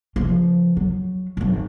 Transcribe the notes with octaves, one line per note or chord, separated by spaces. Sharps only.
C#3 F3
F#3
G#1 F#3